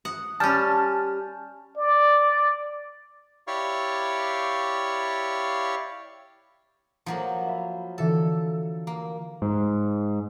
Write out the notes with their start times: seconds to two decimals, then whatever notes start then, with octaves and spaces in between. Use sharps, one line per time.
0.05 F#5 D#6
0.40 G3 C#4 G#5 A5 F6 G6
1.77 D5
3.47 E4 G4 C#5 D5 F5 C#6
7.06 F3 F#3 A#3
7.47 E5 F5 B5
7.98 D3 E3 A4 E6
8.87 A#3
9.42 G#2